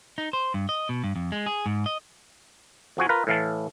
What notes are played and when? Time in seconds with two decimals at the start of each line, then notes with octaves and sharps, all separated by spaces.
0.18 D#4
0.33 C5
0.54 G2
0.69 D#5
0.89 B2
1.04 G2
1.16 F2
1.32 G#3
1.46 G#4
1.66 G#2
1.86 D#5
2.97 F2 F3 F#4 G#5
3.09 F4 A#4 B4
3.27 A2 E3 F5 A5